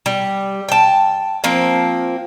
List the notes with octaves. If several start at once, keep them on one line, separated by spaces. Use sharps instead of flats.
G3
G5 A5
F3 A#3 C4